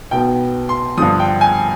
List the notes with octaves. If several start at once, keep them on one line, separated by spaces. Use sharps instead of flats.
B1 B2 B3 G5
C6
G2 D3 F3 D#6
G5
G#5